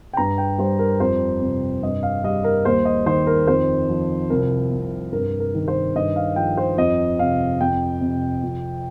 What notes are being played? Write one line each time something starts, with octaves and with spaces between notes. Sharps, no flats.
G5
G2 A#5
G5
G3 C5
A#4
F2 C5
C3
G2 D#5
F5
G3 D#5
A#4
D#2 C5
D#5
D#3 C5
A#4
F2 C5
F3
C2 A#4
C3
G2 A#4
A#4
D#3
C5
G2 D#5
F5
F3 G5
C5
F2 D#5
C3 F5
F2 G5
C3
F2